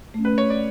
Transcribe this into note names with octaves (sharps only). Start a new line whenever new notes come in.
A3 C#4
B4
C#5
D5